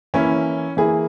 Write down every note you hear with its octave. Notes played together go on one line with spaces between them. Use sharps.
E3 A#3 C#4 E4 C#5
E3 A#3 E4 G#4